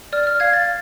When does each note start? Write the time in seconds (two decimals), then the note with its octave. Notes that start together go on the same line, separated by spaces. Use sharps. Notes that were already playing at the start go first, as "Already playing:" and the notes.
0.13 D5 F6
0.27 F6
0.40 F5 G#6
0.53 A6